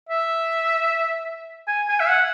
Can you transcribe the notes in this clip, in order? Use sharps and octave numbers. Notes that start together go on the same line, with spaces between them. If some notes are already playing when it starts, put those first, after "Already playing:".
E5
G#5
G#5
E5
F#5